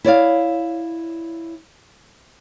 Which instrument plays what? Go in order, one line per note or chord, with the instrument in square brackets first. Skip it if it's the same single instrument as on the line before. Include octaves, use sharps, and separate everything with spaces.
[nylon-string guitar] E4 C#5 D5 F5